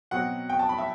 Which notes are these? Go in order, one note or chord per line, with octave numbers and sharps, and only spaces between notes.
B2 F#3 C4 F#5
G5
A5
B5
E5